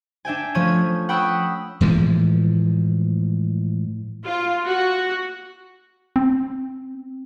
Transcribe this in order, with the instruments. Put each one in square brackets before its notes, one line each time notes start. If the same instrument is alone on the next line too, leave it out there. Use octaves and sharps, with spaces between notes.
[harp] D4 E5 G5 G#5
F3 A3 C#4 C#5 G#6 D#7
F#5 G5 B5 C#6 D#6 E6
[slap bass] A2 E3 F3 G#3
[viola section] F4
F#4
[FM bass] C4